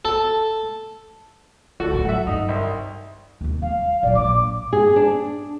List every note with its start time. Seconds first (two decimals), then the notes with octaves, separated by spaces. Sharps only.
0.05 A4
1.80 D2 F#4 A4
1.93 A2 F3
2.05 F#3 E5 F#5
2.27 G2 D#4
2.48 C2
3.41 D#2 C3
3.62 G3 F5
4.03 A#2 F#3 D5
4.15 A#1 D6
4.73 G#4
4.96 D4